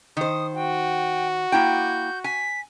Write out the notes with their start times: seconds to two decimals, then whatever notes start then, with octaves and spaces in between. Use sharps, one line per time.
0.17 D#3 C5 D#6
0.55 F#4 G5
1.52 A#3 E4 G5 G6
2.24 G#5 B6